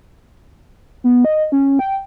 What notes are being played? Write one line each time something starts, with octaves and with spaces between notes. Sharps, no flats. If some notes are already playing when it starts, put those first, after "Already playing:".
B3
D#5
C#4
G5